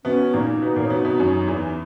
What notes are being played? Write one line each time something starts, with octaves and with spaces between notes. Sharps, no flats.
B2 B3 C#4
A#2 A#3 D#4
B2 B3
A#2 A#3
C#4
B2 B3
B2 B3
F#2 F#3
E2 E3